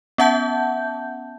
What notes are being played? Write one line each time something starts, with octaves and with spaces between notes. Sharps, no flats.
B3 C#4 E5 F#5 A5 G6